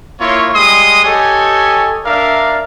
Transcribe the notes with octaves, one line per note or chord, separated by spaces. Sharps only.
A#3 E4 F4 C#5
G3 G#3 D#5 C6 D#6
G4 A4 C#5 D#5 G#5
D4 A#4 D5 E5 F5